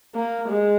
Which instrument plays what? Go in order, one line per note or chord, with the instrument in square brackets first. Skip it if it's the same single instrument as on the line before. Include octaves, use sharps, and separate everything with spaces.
[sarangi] A#3
G#3